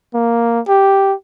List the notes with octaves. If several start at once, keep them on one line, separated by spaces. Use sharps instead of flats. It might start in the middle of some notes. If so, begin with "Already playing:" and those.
A#3
G4